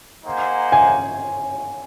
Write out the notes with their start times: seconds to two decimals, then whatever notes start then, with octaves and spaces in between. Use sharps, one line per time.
0.25 A#3 D#4 G#4 C5 F#5
0.72 G#5